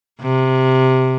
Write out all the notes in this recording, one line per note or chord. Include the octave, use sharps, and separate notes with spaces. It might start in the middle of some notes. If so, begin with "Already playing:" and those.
C3